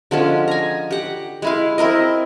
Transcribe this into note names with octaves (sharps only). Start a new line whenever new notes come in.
D3 F3 G#3 C#4
G#5 A#5
G4 F#5
G#3 E4 F5
C4 E4 A#4 D#5